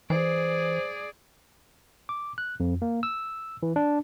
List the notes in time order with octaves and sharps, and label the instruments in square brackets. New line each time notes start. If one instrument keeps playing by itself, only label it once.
[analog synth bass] E3 [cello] G#4 D5 [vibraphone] C5
[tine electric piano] D6
F#6
F2
A#3
E6
E3
D4